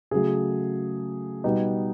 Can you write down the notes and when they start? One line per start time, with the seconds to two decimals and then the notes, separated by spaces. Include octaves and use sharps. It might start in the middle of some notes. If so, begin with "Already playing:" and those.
0.11 C#3 F#3 A3 G#4
1.44 B2 G3 B3 D#4